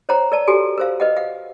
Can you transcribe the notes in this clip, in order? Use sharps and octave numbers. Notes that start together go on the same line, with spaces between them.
C5 C#5 F#5 A#5
A#4 D5 A5
F#4 G4 A4 G#5
A#4 C5 F5
B4 D#5 F#5
F5 F#5